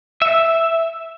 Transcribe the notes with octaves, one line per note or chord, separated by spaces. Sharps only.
E5